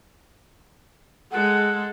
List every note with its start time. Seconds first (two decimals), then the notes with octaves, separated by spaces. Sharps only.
1.32 G#3 A4 F#5